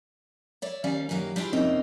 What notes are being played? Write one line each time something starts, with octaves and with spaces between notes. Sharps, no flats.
C#5 D5 E5
D#2 G3 C#4 D5 F5
F#2 D#3 F#3 A#3 F5
G3 D4 E4 F4 G#4
F2 C3 A#3 C4 C#4 D#4